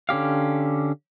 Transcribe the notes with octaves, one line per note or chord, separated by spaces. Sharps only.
D3 C#4 G4 F5